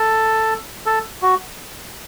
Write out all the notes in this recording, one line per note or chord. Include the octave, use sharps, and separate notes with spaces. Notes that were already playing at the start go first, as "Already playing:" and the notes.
Already playing: A4
A4
F#4